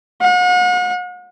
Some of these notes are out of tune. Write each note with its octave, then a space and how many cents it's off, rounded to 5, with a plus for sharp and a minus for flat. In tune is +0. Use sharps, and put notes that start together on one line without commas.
F#5 -40